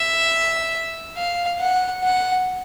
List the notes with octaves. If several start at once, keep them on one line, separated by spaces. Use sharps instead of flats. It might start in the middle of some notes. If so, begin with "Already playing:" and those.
Already playing: E5
F5
F#5
F#5